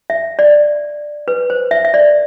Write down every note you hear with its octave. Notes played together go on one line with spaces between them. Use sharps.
E5
D5
B4
C5
E5
E5
D5